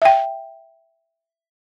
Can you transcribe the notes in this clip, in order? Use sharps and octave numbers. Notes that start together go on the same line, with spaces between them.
E5 G5